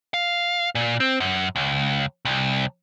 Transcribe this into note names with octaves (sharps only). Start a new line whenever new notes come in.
F5
A#2
C4
F#2
C#2
C2